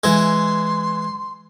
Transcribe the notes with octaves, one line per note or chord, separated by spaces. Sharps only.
E3 G#3 C6